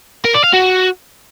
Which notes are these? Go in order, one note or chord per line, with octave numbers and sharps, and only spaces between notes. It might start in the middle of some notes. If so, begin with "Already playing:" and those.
A#4
D5
F5
F#4